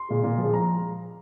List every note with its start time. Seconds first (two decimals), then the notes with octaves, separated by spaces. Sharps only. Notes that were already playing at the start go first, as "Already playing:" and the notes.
Already playing: C6
0.09 A#2 G#3
0.24 A#2
0.38 F3 G#3
0.54 A#5